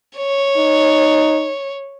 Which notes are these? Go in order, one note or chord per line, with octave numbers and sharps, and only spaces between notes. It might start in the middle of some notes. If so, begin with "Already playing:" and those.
C#5
D#4